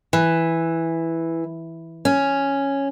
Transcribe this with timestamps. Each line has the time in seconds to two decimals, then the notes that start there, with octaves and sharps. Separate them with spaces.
0.13 E3
2.05 C#4